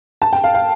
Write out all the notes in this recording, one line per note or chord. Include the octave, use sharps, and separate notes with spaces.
A5
G5
F5
F5